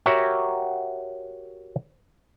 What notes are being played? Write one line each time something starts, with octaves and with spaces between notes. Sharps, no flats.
F#4 G4 A#4 C#5 E5 F#5